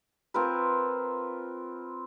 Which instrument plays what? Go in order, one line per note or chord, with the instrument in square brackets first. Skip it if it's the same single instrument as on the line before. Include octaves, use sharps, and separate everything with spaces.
[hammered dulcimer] C4 F4 A#4 B4